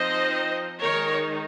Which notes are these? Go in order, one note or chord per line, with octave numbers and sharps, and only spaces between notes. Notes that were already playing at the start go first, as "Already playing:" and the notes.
Already playing: F3 C4 D#4 C5 D#5
D#3 G#3 D#4 A#4 C#5